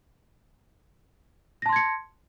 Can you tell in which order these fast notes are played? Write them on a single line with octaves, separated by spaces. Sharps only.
A#6 A5 C6 G#6 C#7